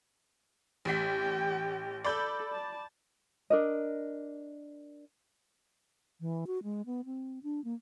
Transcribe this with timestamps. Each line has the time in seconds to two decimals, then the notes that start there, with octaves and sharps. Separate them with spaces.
0.85 A1 G4 G5 B6
2.05 A4 D5 B5 G6
2.52 A5
3.50 D4 A#4 D#5
6.21 E3
6.47 F#4
6.63 G#3
6.86 B3
7.05 C4
7.43 D4
7.64 A#3